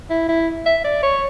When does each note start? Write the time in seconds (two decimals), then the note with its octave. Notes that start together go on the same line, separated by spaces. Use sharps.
0.10 E4
0.28 E4
0.66 E5
0.84 D5
1.03 C#5